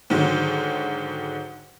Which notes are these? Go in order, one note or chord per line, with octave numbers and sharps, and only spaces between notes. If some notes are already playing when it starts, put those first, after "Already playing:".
G#2 D3 D#3 F#3